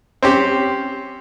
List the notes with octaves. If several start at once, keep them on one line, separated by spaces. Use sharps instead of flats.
C4 C#4 G4